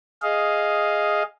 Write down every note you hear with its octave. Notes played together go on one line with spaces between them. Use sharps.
G#4 D#5 F5